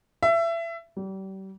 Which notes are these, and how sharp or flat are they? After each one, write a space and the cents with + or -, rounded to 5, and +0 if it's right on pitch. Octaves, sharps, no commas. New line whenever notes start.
E5 +25
G3 -35